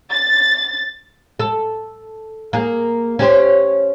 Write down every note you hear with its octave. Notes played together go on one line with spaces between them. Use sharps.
A6
A4
A#3 G#4
C#4 G4 C5